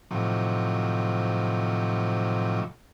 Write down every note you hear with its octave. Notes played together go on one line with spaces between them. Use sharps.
A2 C3 D#3 F3 F#3